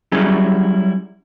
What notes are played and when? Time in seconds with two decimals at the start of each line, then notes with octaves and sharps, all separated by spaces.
0.12 F#3 G3 C#4 E4 G4 G#4